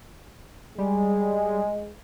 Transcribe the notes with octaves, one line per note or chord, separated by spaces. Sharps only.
G3 G#3